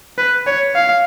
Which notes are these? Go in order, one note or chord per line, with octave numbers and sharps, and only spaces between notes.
B4
C#5
F5